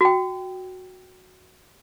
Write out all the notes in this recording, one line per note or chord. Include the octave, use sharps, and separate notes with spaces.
F#4 G5